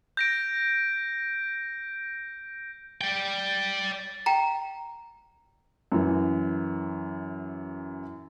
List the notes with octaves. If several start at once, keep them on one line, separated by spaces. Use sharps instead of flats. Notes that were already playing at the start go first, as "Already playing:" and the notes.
G6 A#6 D7
D5 G5
G5 A#5
F#2 E3